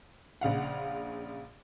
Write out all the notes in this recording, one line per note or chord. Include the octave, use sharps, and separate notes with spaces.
A#1 C#3 F5 F#5